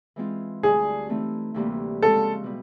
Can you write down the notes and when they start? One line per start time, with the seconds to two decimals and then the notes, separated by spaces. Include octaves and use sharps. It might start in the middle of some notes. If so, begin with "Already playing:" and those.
0.16 E3 G#3 C4 F4
0.63 D2 D3 G3 G#4
1.09 E3 A3 C4 D#4
1.54 D2 C3 E3 G3 A#3
2.02 C#3 F3 G#3 C4 A4
2.44 B2 G3